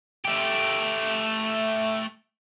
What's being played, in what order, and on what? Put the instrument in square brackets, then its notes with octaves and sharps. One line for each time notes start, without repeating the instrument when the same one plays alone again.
[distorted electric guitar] A3 G4